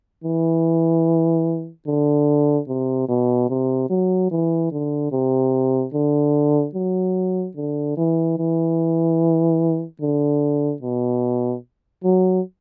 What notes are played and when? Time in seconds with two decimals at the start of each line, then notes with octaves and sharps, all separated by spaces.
0.24 E3
1.87 D3
2.68 C3
3.09 B2
3.49 C3
3.90 F#3
4.31 E3
4.71 D3
5.12 C3
5.93 D3
6.75 F#3
7.56 D3
7.97 E3
8.38 E3
10.01 D3
10.82 B2
12.04 F#3